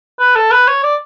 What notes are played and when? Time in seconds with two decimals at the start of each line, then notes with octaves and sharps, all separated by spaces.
0.20 B4
0.36 A4
0.52 B4
0.68 C#5
0.83 D5